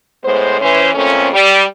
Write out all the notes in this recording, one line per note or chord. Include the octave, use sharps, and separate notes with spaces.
A2 G#3 B3 C5
E3 C#4 C5
F2 A#2 A3 C4 C#4
G3